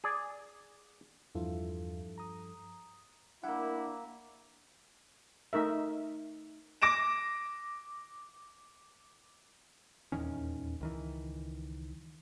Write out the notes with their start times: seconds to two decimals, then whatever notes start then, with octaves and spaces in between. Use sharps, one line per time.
0.04 G#4 D5
1.35 E2 G2 F3 E4 F4 A4
2.18 A#5 D#6
3.44 G3 A#3 D4 E4 F#5
5.53 A3 D#4 A#4 E5
6.82 D6 A#6 D7 E7
10.12 D#1 E2 D#3 C#4
10.81 C#2 D#3 E3